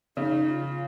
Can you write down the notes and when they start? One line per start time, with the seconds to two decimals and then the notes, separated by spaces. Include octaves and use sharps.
0.17 C#3 D#4
0.49 F4